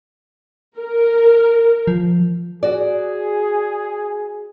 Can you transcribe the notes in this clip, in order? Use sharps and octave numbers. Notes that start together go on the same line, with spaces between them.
A#4
F3
F#4 G#4 D5